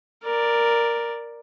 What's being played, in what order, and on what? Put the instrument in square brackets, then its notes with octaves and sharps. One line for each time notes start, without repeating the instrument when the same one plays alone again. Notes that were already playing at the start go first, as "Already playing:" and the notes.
[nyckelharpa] A#4 D5